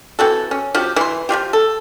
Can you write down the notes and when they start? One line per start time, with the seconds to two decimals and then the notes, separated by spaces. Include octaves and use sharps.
0.19 E3 C4 F#4 A4
0.51 C#4
0.75 F3 F#4 G4
0.96 E3 C6
1.29 F3 G3 F4 G4
1.53 A4